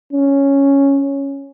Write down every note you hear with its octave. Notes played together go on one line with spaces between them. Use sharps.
C#4